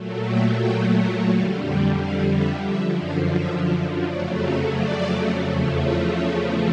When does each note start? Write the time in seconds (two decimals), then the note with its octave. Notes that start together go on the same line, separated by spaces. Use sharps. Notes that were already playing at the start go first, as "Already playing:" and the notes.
Already playing: A#2 F#3 A3
0.27 G5
0.61 G5
0.96 F#5
1.30 F2 D3 G3 F5
1.65 G5
1.99 F5
2.34 E5
2.68 F#2 D3 F3 E5
3.03 F5
3.37 E5
4.06 F2 C#3 F#3 A3 D5
4.41 C#5
4.75 D5
5.44 E2 C#3 F3 A3
5.78 C#5
6.13 C#5